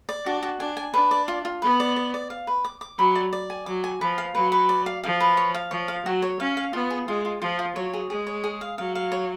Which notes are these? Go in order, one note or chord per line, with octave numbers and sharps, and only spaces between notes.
D5
D4 F#4
F#4
D4 G#5
G#5
D4 B4
D5
F4
F4
B3 B4
D5
D5
D5
F5
B4
D6
D6
F#3 B5
D5
D5
G#5
F#3 D6
G#5
F3 B4
F5
F#3 B4
B4
D5
F5
F3 F5
B4
C#5
F5
F3 C#5
F5
F#3 F#4
C#5
C#4 F5
F5
B3 F4
G#4
G#3 F4
F4
F3 F4
F4
F#3 C#5
G#4
G#3 G#4
C#5
G#4
F5
F#3 F5
F5
C#5